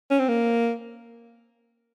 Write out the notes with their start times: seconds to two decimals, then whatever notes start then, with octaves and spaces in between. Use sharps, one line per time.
0.11 C#4
0.19 C4
0.29 A#3